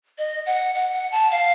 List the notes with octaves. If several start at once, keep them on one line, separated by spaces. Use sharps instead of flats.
D#5
F#5
F#5
F#5
A5
F5